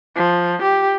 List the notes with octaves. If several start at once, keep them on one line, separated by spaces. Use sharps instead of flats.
F3
G4